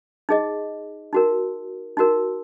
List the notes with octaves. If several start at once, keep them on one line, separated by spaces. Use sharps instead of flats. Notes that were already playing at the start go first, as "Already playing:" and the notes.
D#4 G#4 D#5
D#4 F#4 A#4
D#4 F#4 A#4